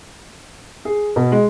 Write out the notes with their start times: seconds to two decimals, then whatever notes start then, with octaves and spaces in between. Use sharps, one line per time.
0.85 G#4
1.16 B2
1.32 G#3